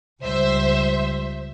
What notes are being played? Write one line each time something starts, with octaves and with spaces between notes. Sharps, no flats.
C#2 G3 C5 E5